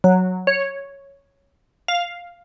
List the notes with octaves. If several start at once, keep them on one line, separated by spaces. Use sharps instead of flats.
F#3
C#5
F5